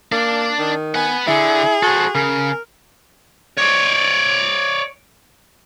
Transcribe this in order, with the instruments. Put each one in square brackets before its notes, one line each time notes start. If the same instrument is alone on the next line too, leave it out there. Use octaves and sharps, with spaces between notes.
[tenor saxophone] A#3 [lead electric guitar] D4 D5
[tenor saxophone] D#3
[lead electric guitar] B4 F#5 [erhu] G#5
[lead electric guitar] D3 [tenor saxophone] E4 [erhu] G#4
[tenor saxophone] F#4 [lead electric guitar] A4 C5
[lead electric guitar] C#3 [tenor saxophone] A#4
[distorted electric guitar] C#5 D5